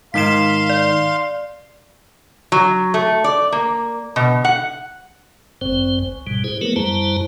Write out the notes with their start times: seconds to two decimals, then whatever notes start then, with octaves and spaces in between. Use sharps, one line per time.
0.14 G#2 D#3 D#4 F5 C6 B6 E7
0.70 D5
2.52 F#3
2.94 A3
3.24 D5
3.52 A#3
4.16 B2
4.44 F#5
5.61 G1 F#2 C4 C5
5.99 C#2
6.27 G#2 B2 G3
6.44 E4 G#4 C5
6.61 F#3 A3 B3 G#4 A#4 B4
6.76 F#2 G3 E4 C5 A5 A#5